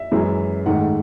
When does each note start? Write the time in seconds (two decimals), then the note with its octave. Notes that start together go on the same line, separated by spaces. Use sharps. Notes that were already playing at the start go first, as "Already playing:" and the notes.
Already playing: E5
0.12 F#2 E3 G#3
0.66 G#2 D#3 A3 F#5